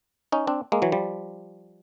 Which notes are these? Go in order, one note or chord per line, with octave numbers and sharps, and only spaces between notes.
C#4 D#4
C4 D4
G#3 A#3
E3 F#3
F3 G3